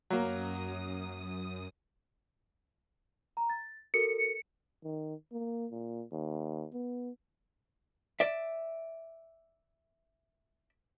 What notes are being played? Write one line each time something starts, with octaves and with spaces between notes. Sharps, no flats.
F#2 F#3 A#3 D#6
A#5
A6
F#4 A4 A#4 C#7
D#3
A#3
A#2
D#2
B3
D5 E5